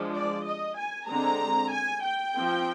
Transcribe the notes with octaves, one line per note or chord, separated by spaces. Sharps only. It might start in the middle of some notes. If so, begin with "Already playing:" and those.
Already playing: F3 G#3 D4
D5
D#5
G#5
D3 G#3 C4 A#5
G#5
G5
F3 C4